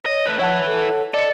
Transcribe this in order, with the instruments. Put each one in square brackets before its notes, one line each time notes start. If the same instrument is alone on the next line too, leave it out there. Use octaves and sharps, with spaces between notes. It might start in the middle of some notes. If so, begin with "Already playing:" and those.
[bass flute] C#5 [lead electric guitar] D#5
[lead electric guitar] A3 B4
[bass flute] F3 [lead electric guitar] E4 B4 [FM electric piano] C#5 F#5 A5
[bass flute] A4
[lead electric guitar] A4 [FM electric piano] D5 C#7 [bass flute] D#5